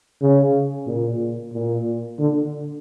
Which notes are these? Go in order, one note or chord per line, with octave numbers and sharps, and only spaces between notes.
C#3
A#2
A#2
D3